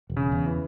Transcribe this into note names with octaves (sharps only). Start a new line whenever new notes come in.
E1
C#3
E2
E3